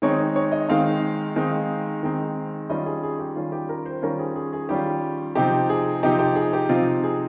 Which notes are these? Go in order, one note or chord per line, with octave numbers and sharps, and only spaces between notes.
D#3 G#3 C4 D#4 C#5
C#5
D#5
D#3 G#3 C4 D#4 F5
D#3 G#3 C4 D#4
D#3 G#3 C4 D#4
D#3 G3 C#4 F4 D#5
G#4
G#4
G4
D#3 G3 C#4 F4
G4
A#4
C5
D#3 G3 C#4 F4 A#4
G#4
G#4
G#4
D#3 G3 C#4 F4 G4
C3 F3 C4 D#4 G4
G#4
C3 F3 C4 D#4 G4
G4
G#4
G4
C3 F3 C4 D#4 F4
G#4